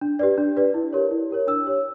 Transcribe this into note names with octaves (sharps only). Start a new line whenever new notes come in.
D4
G4 B4 D5
D4
G4 B4 D5
E4
G4 A#4 C#5
E4
G4 A#4 C#5
D4 E6
G4 C#5